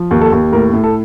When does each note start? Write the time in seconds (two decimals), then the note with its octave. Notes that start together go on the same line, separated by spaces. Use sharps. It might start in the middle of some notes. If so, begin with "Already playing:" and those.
Already playing: F3
0.11 D#2
0.21 A4
0.32 D#2
0.52 A2 A#4
0.73 A2
0.84 A4